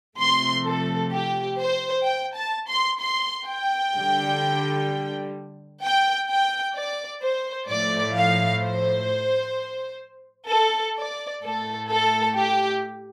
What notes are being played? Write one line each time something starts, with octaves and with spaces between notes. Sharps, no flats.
C3 F3 A3 C6
A4
G4
C5
G5
A5
C6
C6
G5
D3 G3
G5
G5
D5
C5
A2 F3 A3 D5
F5
C5
A4
D5
A2 A3 A4
A4
G4